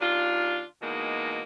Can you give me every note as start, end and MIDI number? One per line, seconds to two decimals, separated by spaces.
0.01 0.62 39
0.01 0.62 62
0.01 0.62 65
0.82 1.42 40
0.82 1.42 47
0.82 1.42 56
0.82 1.42 58
0.82 1.42 63